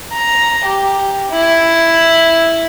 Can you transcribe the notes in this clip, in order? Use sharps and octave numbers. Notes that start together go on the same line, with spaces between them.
A#5
G4
E4